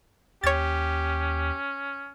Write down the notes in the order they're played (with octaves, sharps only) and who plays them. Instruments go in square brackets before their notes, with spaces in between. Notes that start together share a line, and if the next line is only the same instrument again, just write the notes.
[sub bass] D#2 [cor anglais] C#4 [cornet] G4 [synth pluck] C#5 A6